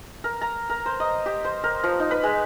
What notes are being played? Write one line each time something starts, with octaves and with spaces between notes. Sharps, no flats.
A#4
A#5
A#4
C5
D#5
G4
C5
A#4
F3
D#4
B4
G#3